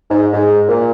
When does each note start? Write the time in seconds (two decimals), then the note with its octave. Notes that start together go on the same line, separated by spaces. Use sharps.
0.10 G#2
0.33 G#2
0.68 A#2